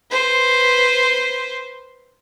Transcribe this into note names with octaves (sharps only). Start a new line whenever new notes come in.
B4 C5